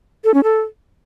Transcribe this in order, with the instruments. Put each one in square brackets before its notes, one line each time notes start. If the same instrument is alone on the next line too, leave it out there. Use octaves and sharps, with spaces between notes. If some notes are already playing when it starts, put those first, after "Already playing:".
[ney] A4
C#4
A4